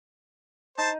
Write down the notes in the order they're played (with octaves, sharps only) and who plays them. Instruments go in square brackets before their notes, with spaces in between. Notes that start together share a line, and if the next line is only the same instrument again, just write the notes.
[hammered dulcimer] D#4 [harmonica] C5 A5